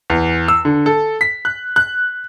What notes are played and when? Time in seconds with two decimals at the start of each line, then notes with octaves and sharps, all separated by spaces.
0.10 E2
0.48 E6
0.65 D3
0.86 A4
1.21 B6
1.45 F#6
1.76 F#6